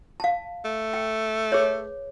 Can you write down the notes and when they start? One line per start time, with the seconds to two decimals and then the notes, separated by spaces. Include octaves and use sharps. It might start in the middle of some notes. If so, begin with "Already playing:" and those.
0.20 F5 A5
0.65 A3
0.94 G5
1.52 G#4 B4 C#5